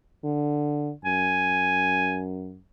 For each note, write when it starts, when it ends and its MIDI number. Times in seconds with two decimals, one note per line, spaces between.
0.24 0.92 50
1.05 2.58 42
1.05 2.22 80